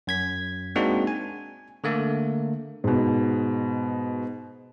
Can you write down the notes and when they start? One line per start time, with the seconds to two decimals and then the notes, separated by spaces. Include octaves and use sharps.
0.07 F#2 G#6 B6
0.76 G#3 A#3 C4 D4 D#4 F#4
1.07 G#5
1.84 D3 A3 A#3
2.84 G#2 B2